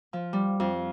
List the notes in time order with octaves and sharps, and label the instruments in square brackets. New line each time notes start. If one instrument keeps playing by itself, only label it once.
[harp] F3
G3
F2